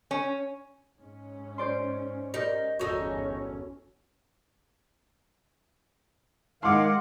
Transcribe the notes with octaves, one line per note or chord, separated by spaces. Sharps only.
C#4
G#2 C#4
C5 D5 C6
D#4 G4 A#4
G1 E2 C#4 D#4 F#4 A4 C#5
D#3 G#3 F5 F#5 C6 D6